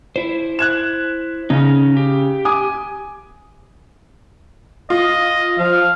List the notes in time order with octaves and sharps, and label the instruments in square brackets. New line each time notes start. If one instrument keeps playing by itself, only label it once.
[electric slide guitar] E4 C5
[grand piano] F#6 G#6 E7
[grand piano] C#3 [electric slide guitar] C#4 D#4
[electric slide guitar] G4
[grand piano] G#5 D6 D#6
[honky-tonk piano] F4 [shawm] D#5
[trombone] F3 [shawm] F5